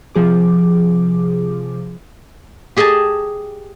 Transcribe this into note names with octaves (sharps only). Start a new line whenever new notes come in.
C3 F3 G#4 D6
G4 G#4 D#5 G#5 A5